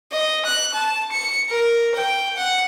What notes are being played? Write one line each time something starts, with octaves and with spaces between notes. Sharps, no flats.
D#5
F#6
A5
C#7
A#4
G5
F#5